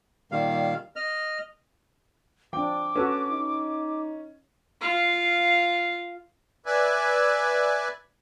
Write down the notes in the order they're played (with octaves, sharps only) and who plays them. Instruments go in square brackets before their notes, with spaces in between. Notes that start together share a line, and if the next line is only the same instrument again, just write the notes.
[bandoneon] A#2 D#3 G3 F5
D#5 F6
[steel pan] F3 D4 [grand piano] G5 [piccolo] D6
[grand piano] C#4 [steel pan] F#4 A4 B4
[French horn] D#4
[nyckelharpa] F4 F5
[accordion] B4 D5 E5 G#5